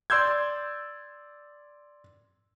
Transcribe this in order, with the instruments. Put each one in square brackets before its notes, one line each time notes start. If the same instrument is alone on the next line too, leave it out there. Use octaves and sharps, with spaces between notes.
[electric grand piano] D5 C6 E6 G6 G#6